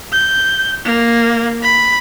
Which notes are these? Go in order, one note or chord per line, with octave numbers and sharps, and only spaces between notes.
G6
A#3
B5